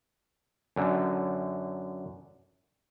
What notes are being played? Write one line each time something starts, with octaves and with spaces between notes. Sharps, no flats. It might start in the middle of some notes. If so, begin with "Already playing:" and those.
F#2 D3